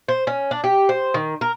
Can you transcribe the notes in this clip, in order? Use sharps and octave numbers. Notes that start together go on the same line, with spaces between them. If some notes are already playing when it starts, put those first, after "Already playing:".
C5
C#4
D4
G4
C5
D#3
A#4